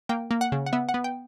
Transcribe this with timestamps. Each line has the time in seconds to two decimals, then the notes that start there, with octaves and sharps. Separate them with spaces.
0.09 A#3 G5
0.31 A#3
0.41 F#5
0.52 C#3
0.66 F#5
0.73 B3 E5
0.89 F#5
0.94 B3
1.04 G5